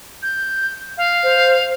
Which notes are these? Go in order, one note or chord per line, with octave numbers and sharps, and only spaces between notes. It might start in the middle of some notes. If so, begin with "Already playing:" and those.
G6
F5
C5